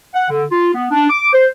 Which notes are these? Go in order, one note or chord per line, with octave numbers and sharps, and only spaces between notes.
F#5
D3
F4
B3
D4
D6
C5